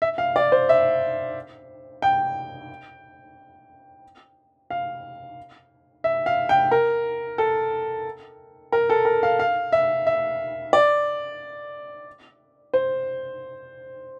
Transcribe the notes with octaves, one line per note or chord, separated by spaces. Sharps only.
E5
F5
D5
C5
E5
G5
F5
E5
F5
G5
A#4
A4
A#4
A4
A#4
F5
F5
E5
E5
D5
C5